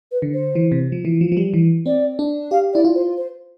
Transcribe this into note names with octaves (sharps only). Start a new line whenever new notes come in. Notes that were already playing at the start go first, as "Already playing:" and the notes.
B4
D3
C5
E3
C3
F3
E3
F3
F3
G3
E3
C4 D5
D4
G4 F5
E4 D5
F4
C5
C5